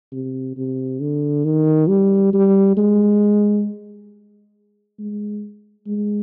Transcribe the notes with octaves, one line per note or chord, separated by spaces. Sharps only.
C3
C3
D3
D#3
G3
G3
G#3
G#3
G#3